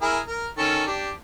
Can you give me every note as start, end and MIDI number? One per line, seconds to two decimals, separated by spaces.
0.02 0.19 64
0.02 0.19 68
0.02 0.19 70
0.28 0.47 70
0.58 0.85 51
0.58 0.85 61
0.58 0.85 69
0.87 1.11 62
0.87 1.11 67